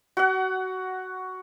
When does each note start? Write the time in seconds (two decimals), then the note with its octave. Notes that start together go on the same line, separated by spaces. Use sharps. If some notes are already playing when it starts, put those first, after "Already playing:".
0.17 F#4 F#5